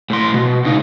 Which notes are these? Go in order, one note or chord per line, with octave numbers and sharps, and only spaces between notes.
A2 C6
B2
C#2 D#4